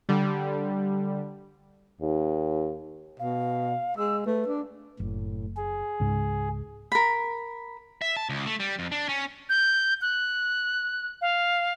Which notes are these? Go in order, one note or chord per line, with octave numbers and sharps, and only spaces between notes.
D3 G3
D#2
B2 F5
G#3 E6
A3 B4
D4
F#1 A2
G#4
C#2 G#2
A#4 B5
E5
A5
C#2
A3
G3
F2
D4
C#4
G6
F#6
F5